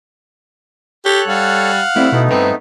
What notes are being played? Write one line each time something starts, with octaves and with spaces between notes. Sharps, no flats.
G4 A4 C#5 F#6
G3 F5 F#5
G3 A3 C4 E4
B2 A3 B3 D#4
G2 C4 B4 A#5